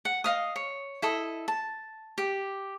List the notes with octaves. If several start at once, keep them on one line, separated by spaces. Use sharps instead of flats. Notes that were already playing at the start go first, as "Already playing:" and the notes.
F#5
D#5 F5 D#6
C#5
E4 A4 D#5
A5
G4